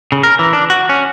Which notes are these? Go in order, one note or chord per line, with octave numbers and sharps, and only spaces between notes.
C#3
A#4
E3
D4
F#4
C#4